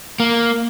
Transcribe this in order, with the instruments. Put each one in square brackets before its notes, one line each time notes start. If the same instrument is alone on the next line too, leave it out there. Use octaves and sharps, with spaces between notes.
[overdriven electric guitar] A#3